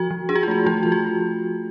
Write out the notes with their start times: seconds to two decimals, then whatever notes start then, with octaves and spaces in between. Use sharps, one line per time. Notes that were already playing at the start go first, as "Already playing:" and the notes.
Already playing: F3 F#4
0.11 F3
0.29 D4 G#4
0.35 F#4
0.43 F4
0.48 A3 F#4
0.66 F3 F4
0.83 F4
0.85 F3
0.92 F#4